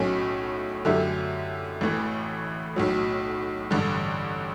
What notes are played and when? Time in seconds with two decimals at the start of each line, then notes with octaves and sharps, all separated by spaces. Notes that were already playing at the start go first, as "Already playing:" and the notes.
Already playing: B1 A2 F#3 A3 C#4
0.85 F#2 D3 A3 E4 G4
1.81 A1 A2 E3 A3
2.76 B1 A2 F#3
3.71 A1 G2 D3